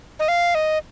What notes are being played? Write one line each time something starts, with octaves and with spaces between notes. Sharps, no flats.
D#5
F5
D#5